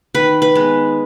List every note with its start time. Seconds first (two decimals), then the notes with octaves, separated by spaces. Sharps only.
0.15 D#3 B4
0.42 B4
0.55 G#3 B3